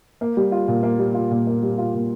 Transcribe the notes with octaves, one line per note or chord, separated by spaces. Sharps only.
A#3
G3
F4
A#2
A#3
G3
F4
A#2
A#3
G3
F4
A#2